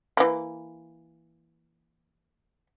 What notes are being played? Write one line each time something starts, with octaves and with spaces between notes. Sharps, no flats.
E3 A#3